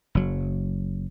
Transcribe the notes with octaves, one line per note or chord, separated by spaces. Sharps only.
F#1 F#3